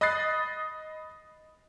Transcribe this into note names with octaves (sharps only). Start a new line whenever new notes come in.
D#5 B5 D#6 F#6 A6 C7